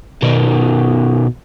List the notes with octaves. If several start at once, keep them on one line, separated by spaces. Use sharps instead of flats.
B2 D#3